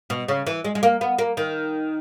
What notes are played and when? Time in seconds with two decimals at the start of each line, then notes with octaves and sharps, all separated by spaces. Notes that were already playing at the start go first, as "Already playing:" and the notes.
0.10 B2
0.28 C#3
0.47 E3
0.64 G#3
0.75 G#3
0.83 A#3
1.01 B3
1.19 A#3
1.37 D#3